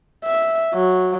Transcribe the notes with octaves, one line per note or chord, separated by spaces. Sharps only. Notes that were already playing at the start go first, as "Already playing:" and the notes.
E5
F#3